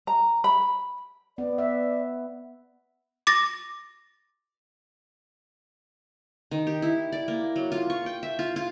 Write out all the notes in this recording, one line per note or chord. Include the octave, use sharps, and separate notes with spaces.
A#5
B5
B3 D5
E5
D6 A6 A#6
D#3
G4
E4
D5
A#3
F#3
F4
C#6
G5
E5
F4
F4